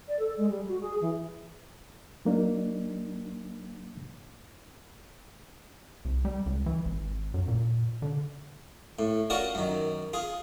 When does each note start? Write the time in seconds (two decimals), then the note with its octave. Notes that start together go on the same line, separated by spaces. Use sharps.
0.08 D5
0.19 A4
0.37 G#3
0.49 G3
0.68 F#4
0.81 G#4
1.01 E3
2.25 F#3 A#3 D4 D#4
6.05 C2
6.25 G3
6.46 C#2
6.66 E3
6.85 G#1
7.34 F#2
7.48 A#2
8.02 D3
8.99 A2
9.30 C#4 F4 F#4 A#4 D5
9.55 F#2 D#3
10.13 F4 G#4